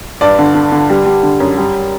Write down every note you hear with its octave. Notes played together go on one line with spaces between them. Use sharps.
G2 D5
D3
D3
D3
G3
G3
D3
F#2
G3